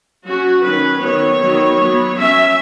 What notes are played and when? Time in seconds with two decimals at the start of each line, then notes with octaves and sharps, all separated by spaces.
0.25 F#3 C#4 F#4
0.64 D#3 F#3 C#4 B4
1.01 D#3 F#3 B3 C#5
1.40 D#3 F#3 B3
1.78 F#3 B3
2.17 F#3 C#4 E5